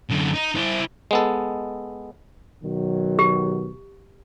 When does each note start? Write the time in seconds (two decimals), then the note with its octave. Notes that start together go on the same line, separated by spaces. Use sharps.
0.10 F#2 D3
0.35 D#4
0.57 E4 C5
1.11 G#3 B3 A4
2.63 B2 D#3 F#3
3.19 G4